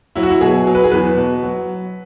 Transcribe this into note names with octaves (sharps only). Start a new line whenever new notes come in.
F#3 E4
F#4
E4
B2 G#4
F#3
B4
G#4
E2 B4
B2
F#3